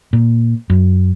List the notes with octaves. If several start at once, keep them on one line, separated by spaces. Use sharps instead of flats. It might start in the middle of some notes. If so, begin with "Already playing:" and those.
A#2
F#2